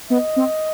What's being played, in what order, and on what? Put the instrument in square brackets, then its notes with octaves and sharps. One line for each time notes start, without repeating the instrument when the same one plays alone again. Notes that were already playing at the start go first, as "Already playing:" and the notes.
[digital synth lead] B3 [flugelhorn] D#5
[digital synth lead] C4